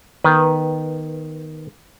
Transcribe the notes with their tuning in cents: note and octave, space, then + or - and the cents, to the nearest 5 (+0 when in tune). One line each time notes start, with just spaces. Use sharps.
D#3 +0 B3 -15 B4 +0